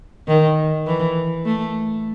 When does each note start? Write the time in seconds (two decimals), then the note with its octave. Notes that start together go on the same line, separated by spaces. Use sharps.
0.28 D#3
0.87 E3
1.46 A3